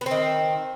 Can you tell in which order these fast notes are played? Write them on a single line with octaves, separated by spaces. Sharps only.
B3 C4 D#3